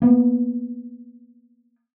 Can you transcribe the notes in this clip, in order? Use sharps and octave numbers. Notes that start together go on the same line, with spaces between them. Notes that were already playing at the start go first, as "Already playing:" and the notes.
A#3 B3